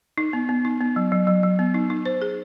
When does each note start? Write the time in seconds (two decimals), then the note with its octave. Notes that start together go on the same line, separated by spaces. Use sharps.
0.18 D#4
0.33 B3
0.49 B3
0.65 D#4
0.81 B3
0.96 F#3
1.12 F#3
1.27 F#3
1.43 F#3
1.59 B3
1.74 D#4
1.90 D#4
2.06 C5
2.21 G#4